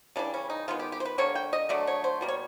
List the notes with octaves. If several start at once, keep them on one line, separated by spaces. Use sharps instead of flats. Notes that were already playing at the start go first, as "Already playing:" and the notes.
C#3 E3 G3 D4
C#4
D#4
D#3 G#3 B3 F4
G4
G4
C5
B4
D3 G3 A#3 C#5
G5
D#5
D3 F#3 A3 D5
C#5
C5
B2 G3 A#3
C#5